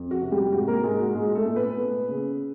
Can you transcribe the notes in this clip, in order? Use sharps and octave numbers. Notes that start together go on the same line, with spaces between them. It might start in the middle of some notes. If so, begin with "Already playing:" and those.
Already playing: F2
F#4
C3
G3 G4
G#2 F#4
A#3 A#4
G#2 G#3 G#4
F#4
A#2 G#3 G#4
A3 A4
A#2
B3 B4
B3
C#3